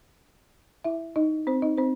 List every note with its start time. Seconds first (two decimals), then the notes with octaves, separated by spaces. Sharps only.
0.84 E4 E5
1.16 D#4 D#5
1.47 C4 C5
1.62 D#4 D#5
1.78 C4 C5